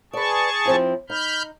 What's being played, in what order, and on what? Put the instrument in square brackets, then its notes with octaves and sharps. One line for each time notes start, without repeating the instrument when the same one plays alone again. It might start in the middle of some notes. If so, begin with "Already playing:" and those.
[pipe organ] G#4 A5 C#6 [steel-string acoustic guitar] B4 D5
[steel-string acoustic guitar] F3 C4 E4
[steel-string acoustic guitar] D#4 [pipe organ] B5 F6 G6